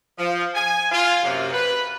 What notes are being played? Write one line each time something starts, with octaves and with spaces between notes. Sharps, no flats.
F3
G#5
F4
F#2 C3 A#3
B4